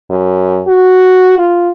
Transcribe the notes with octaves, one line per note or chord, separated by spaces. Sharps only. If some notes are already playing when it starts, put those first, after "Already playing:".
F#2
F#4
F4